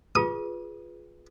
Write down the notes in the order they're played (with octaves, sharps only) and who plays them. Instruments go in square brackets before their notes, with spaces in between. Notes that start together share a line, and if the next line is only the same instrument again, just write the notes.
[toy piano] F4 G#4 B4 [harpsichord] D#6